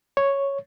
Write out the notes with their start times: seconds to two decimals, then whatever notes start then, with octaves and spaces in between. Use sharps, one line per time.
0.17 C#5